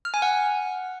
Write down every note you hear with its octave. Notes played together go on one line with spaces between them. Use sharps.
F6
G#5
F#5